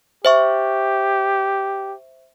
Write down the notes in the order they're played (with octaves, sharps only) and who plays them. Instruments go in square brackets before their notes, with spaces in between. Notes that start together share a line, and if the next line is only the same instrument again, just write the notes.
[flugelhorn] G4 [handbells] C5 E5 C#6